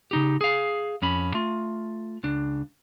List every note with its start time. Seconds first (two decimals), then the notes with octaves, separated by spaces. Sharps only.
0.11 C#3 D#4 G4
0.41 G#4 F5
1.02 F2 C#4 B5
1.34 A3 F4
2.23 C#2 D4